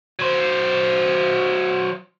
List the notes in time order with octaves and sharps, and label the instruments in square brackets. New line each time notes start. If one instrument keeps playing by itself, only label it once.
[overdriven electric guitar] F#3 C5